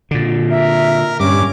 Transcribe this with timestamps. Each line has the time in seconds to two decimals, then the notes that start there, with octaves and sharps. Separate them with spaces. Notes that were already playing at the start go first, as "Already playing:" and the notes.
0.11 A#2 D3
0.51 A#4 E5
1.20 G2 C#4 D6